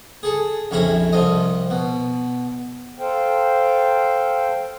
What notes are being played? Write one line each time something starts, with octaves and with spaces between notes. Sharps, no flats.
G#4 A4
A#1 F2 C#4 E4 A#5
C2 F3 D#5
B2
A4 C5 F5 G5